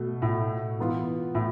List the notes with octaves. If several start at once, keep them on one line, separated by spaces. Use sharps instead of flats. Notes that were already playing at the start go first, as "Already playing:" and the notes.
Already playing: B2 A3
A2
E3 B3 F4
A2